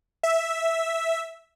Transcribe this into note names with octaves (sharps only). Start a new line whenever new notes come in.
E5